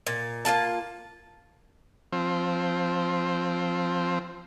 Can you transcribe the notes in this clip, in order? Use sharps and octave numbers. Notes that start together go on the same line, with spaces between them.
A#2
A#3 D4 F4 A5
F3 C4